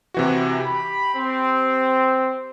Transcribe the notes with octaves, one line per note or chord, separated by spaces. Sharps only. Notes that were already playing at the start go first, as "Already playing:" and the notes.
C3 E3 F#4
G4 B5
C4